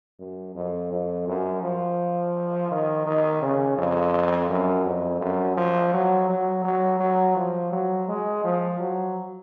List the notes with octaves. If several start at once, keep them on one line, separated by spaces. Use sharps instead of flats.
F#2
F2
F2
F#2
F3
D#3
D#3
C#3
F2
F#2
F2
F#2
F3
F#3
F#3
F#3
F#3
F3
F#3
G#3
F3
F#3